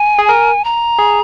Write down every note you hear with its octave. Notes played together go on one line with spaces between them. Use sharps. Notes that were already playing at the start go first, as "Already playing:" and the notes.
Already playing: G#5
G#4
A#4
A#5
G#4